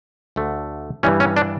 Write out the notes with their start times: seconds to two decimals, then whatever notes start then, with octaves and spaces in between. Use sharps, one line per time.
0.36 D2 D3 A3
1.03 G2 E3 G3 C#4
1.20 C#4
1.36 D4